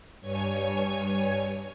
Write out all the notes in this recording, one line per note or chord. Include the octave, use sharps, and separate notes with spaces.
G2 C#5 G#5 G#6